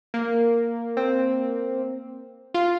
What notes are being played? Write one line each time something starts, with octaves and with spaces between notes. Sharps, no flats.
A#3
C4
F4